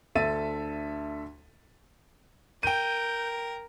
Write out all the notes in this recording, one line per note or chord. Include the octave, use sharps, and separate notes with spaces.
D2 D3 A4 E5 A6 D#7
A#4 G5 G6 D#7